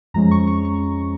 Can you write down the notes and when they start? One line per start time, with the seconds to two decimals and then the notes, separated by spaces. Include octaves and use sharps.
0.14 F2 F3 G#3 C#4 A#5
0.31 C#6
0.47 C#6
0.65 C#6